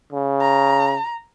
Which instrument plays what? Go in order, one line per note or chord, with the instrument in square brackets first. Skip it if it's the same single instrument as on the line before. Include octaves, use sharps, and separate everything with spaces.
[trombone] C#3
[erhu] A#5